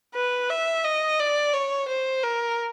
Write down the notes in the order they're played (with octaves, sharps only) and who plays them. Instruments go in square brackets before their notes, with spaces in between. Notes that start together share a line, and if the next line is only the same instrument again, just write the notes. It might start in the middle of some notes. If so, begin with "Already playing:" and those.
[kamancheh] B4
E5
D#5
D5
C#5
C5
A#4